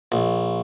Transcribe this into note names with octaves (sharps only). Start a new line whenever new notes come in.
A#1